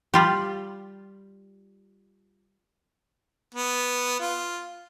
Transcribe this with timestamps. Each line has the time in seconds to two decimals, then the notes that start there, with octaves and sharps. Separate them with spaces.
0.14 G3 F4 G4
3.54 B3
4.20 F4